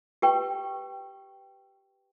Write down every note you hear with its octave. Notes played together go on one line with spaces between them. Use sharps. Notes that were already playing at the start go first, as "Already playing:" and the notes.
G4 B4 G5 C#6